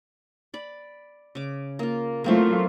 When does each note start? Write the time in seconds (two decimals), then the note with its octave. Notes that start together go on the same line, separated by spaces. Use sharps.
0.54 D5 B5
1.35 C#3 D6
1.79 A#3 F4
2.24 F#3 A3 A#3 C4 E4 F4